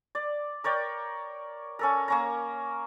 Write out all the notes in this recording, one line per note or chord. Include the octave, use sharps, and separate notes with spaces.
D5
A#4 C#5 D5 G5
C#4 A4 A#4
A#3 C#4 A#5